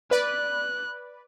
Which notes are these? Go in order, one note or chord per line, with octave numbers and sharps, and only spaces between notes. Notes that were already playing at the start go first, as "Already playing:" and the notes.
B4 D5 F#6